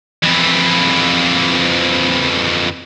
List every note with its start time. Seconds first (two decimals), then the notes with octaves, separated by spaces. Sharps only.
0.23 F2 E3